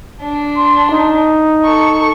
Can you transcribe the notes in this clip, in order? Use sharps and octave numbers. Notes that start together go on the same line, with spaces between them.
D4
C6
D#4
A4 C#6